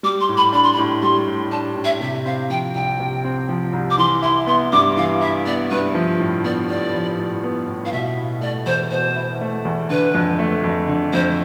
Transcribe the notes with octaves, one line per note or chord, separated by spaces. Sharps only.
G3 D6
C6
A2
B5
D4 B5
C6
B5
A2
G3 C6
A2
D4 A5
A2
E5
C3 E5
C4 F5
F3 G5
C2 G5
C3
C4
F3
C2
D6
E3 C6
E4 C6
B3 C6
G2 D6
E3 F5
E4 E5
B3 D5
G2 B4
F3
A2
B3 D5
A2 D5
F3
A2
B3
A2
F5
B2 E5
E4
A3 D5
E2 C5
B2 C5
E4
A3
E2
D3 B4
F2
A3
F2
D3
F2 C5